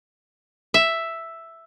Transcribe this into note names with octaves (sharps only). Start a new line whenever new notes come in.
E5